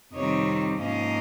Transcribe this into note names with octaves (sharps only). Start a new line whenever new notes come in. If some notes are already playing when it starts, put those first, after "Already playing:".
F2 C3 D#3 G3 C4 C#5 D#5
G#2 F3 A#3 C#4 D#5 F5